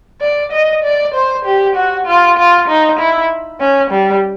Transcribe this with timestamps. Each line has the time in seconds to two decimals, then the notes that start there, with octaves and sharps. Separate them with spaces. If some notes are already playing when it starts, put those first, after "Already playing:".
0.21 D5
0.52 D#5
0.84 D5
1.14 C5
1.45 G4
1.76 F#4
2.07 F4
2.37 F4
2.68 D#4
3.00 E4
3.60 C#4
3.91 G3